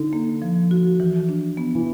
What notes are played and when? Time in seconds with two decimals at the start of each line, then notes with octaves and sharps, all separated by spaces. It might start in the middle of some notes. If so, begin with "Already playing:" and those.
Already playing: D3 D#4
0.13 A#3
0.42 F3
0.71 F#4
1.00 E3
1.29 D4
1.57 B3
1.75 E3